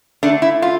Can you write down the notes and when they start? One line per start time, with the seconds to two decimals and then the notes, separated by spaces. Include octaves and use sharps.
0.23 D3 A3 D4
0.42 E4
0.62 F4